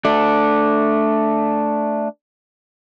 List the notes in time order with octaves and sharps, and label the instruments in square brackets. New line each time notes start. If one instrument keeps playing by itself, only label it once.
[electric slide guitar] A3 D4